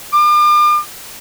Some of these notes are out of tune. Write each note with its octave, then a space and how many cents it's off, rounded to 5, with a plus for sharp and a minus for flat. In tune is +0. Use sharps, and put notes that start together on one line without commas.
D6 +40